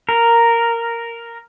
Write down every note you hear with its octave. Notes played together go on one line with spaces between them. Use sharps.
A#4